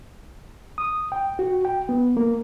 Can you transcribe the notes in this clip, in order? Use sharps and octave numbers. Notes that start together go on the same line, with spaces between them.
D#6
G5
F#4
G5
B3
A#3